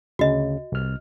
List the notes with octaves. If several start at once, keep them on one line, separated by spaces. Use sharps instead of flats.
D2 C#3 F#4 D#5
C2 F6